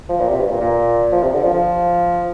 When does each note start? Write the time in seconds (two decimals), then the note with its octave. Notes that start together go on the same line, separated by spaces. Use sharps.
0.09 F3
0.20 A#2
0.30 C3
0.40 G2
0.50 A#2
0.60 A#2
1.12 F3
1.23 C3
1.33 D3
1.43 F3
1.54 F3